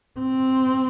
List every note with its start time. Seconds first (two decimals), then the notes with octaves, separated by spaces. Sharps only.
0.20 C4